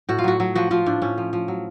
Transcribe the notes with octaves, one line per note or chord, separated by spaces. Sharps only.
A2 F#4
F4
F#3 F#4
F#3
F3 F#4
F3 F4
A2 D4
A2 C#4
F3
F3
F#3